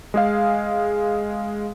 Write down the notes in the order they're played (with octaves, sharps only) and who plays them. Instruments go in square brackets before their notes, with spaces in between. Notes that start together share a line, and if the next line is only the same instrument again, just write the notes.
[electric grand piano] G#3 G#4 F5